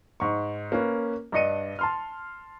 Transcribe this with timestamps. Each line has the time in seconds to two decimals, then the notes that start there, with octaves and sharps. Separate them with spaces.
0.20 G#2 C#6
0.72 A#3 C#4 B4
1.32 G2 D4 D#5 C#7 D#7
1.79 A5 C6 F6